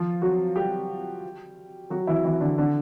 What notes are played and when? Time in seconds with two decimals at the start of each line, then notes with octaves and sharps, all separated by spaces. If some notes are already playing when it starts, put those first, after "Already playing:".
Already playing: F3 F4
0.22 F#3 F#4
0.56 G3 G4
1.90 F#3 F#4
2.07 E3 E4
2.25 E3 E4
2.41 D3 D4
2.58 D3 D4